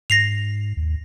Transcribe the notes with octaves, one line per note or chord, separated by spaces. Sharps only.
G#2 A#6 C7 F7
D#2